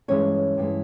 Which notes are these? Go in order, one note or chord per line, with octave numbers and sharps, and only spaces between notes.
G2 E3 G#3 C#4 C#5
G2 E3 G#3